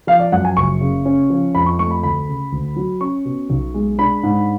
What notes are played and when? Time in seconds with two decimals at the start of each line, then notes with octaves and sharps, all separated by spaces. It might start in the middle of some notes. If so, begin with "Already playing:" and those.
0.07 F3 F5
0.19 D5
0.32 F#2 F#5
0.45 G#5
0.57 F#1 C#6
0.81 C#3
1.05 C#4
1.30 F3
1.55 F2 B5
1.66 C#6
1.79 A3 C#6
1.91 B5
2.03 D2 B5
2.28 C#3
2.52 D2
2.76 F#3
3.01 C#4 C#6
3.25 B2
3.50 B1
3.74 G#3
3.99 D4 B5
4.23 G#2